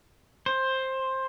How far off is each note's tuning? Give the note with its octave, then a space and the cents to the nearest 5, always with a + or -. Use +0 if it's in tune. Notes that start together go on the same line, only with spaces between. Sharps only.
C5 +10